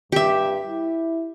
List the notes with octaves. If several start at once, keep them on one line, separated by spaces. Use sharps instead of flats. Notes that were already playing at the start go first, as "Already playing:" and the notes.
G2 G4 E5
E4